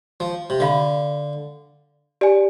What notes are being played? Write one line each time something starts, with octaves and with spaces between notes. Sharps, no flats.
F3
C3
D3 D5 F5 B5
G4 D5 G#5